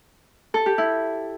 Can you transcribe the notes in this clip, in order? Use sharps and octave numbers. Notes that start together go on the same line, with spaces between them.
A4
G4
E4